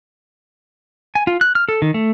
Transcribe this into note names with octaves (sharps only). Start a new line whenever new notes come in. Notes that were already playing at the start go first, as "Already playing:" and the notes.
G#5
F4
F#6
F6
A4
D#3
A3